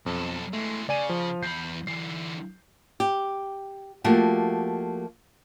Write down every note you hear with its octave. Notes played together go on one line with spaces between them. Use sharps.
B1 F2 A4
E3 G#3 A3
C#3 D5 G#5 D#7
F3
E2 B5 G6 C7
D3 E3 C7
G4
F3 A3 A#3 F#4 G4